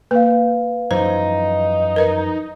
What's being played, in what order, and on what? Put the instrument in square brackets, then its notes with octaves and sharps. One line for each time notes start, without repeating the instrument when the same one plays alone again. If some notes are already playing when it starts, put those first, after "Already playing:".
[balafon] A#3 [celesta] B4 F5
[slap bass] F#2 E3 F3 [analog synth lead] D#4 [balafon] C5
[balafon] A#4 B4 D#5